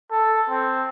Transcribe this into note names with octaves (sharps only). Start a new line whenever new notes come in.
A4
C4